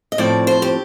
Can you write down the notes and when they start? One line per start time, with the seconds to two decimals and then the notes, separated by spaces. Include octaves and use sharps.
0.12 D#5
0.18 A2 F3 C4 D5
0.47 C5
0.62 G4